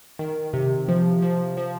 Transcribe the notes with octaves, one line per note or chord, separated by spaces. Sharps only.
D#3
C3
F3
F3
F3